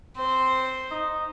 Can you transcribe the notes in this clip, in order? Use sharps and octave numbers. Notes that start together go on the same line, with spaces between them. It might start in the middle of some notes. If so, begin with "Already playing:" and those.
C4 C5
D#4